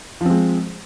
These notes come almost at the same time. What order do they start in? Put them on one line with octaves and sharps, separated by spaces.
F3 C4 G#3